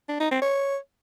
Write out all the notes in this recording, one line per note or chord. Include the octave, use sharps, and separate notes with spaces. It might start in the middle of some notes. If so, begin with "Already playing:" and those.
D4
D#4
C4
C#5